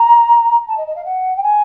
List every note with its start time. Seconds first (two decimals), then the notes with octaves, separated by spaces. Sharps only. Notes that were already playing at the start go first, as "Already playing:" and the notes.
Already playing: A#5
0.68 A5
0.77 D#5
0.87 D#5
0.96 F5
1.05 F#5
1.36 G5
1.43 G#5